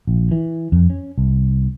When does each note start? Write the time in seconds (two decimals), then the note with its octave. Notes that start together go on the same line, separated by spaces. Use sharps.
0.07 A#1
0.31 E3
0.72 F2
0.90 C#4
1.18 C2